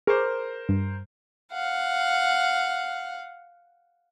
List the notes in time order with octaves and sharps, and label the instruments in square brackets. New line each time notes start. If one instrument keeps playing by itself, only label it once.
[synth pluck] G#4 C#6 D6 [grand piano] A#4 C5
[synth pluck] G2
[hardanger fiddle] F5 F#5